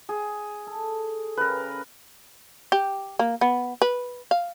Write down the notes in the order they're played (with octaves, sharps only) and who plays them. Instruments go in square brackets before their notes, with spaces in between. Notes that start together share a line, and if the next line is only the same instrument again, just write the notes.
[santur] G#4
[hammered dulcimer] A4
[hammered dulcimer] C#3 [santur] A#4 B4
[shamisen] G4
A#3
B3
B4
F5